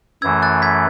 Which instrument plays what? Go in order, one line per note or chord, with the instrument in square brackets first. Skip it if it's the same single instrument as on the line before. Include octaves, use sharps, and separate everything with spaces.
[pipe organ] F#2 E3 A3 [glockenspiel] E6 G#6
[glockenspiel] F#6 A6
G#6 B6